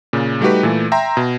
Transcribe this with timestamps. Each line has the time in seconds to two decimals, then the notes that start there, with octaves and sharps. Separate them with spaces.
0.13 A#2 C#3
0.41 G3 A3 D#4 F#4 G4 B4
0.63 A#2 E3 A3
0.92 E5 G5 A#5 C6
1.17 B2